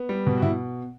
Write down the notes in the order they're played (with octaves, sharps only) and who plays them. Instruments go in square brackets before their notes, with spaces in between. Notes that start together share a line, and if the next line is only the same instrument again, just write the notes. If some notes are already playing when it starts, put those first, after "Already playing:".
Already playing: [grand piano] B3
G3
B2
F#4
B2 E4